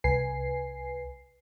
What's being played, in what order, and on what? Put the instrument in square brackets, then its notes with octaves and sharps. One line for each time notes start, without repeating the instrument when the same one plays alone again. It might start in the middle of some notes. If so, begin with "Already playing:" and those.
[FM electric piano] C2 B4 G#5 C7